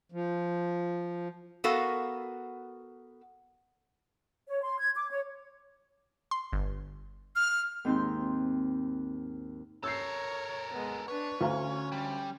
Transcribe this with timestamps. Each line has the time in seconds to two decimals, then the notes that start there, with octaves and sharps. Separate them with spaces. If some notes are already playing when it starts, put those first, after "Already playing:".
0.12 F3
1.64 B3 F#4 A4 A#4 F5
4.47 C#5
4.63 C6
4.79 G#6
4.95 D6
5.11 C#5
6.31 C6
6.53 G1
7.36 F6
7.85 D#2 G#2 C4 D#4 C6 G6
9.84 A4 A#4 C#5 E6 G6 C7
10.73 G#3 B3
11.08 D4 B4 C#5
11.41 D2 C#4 F5 A#5
11.92 G3